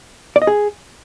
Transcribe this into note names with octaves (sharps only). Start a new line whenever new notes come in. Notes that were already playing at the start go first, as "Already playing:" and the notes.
D5
D#5
G#4